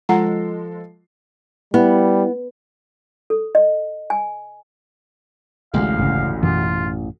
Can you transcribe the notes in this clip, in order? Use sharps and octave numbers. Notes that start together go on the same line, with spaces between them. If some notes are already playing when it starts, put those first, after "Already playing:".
F3 G#3 F4 A4 F#5 A#5 C7
G3 B3 E4
A4
D#5
G#5
A1 D2 G#3 F5
G1 C#3
F#2 B2 E3 F4